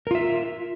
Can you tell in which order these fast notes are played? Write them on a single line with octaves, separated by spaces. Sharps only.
A#4 F4 E5